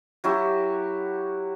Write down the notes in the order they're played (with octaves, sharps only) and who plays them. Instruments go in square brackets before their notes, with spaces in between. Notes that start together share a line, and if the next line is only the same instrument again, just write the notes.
[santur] F#3 E4 F#4 G4